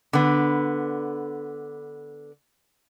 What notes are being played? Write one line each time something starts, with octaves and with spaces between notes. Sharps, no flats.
D3 B3